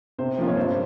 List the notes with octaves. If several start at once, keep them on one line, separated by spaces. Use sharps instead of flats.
C3 C5
F3 A#3 C#4 F4
C#5
G2 C5